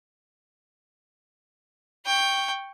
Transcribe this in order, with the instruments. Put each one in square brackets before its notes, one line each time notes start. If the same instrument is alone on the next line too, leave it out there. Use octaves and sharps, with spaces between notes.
[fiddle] G5 C#6